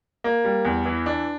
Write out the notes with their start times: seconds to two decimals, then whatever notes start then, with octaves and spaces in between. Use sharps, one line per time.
0.24 A#3
0.45 G3
0.65 E2
0.85 E3
1.06 D4